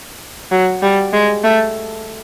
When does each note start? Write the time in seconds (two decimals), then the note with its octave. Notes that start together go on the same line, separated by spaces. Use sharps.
0.51 F#3
0.82 G3
1.13 G#3
1.44 A3